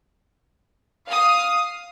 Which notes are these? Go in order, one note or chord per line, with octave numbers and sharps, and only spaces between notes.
F5 D#6